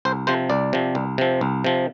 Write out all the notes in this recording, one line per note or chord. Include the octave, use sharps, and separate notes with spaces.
C2 C5
C3 F3 C5
C2 D5
C3 F3
C2
C3 F3
C2
C3 F3